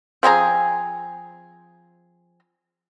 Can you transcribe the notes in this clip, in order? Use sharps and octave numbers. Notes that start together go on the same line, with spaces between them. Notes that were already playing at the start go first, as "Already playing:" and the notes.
F3 C4 G#4 A#5